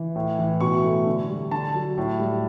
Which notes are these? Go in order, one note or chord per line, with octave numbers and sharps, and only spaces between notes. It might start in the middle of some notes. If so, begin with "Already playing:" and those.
Already playing: E3
A2
E3
B2 C#6
A3
D3
G3
D3 A5
F#3
A2
G3